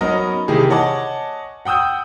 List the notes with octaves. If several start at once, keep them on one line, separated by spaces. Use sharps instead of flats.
F#3 B3 C#4 D#4 A#4 D#5
C3 D#3 E3 A#3 G#4
C#5 D#5 F#5 G#5 A5 D6
F#5 G5 D#6 E6 G6